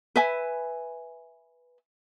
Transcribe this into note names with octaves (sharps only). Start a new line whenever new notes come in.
B4 E5 G#5